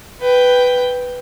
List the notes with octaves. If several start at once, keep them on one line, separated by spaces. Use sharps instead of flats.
B4 G5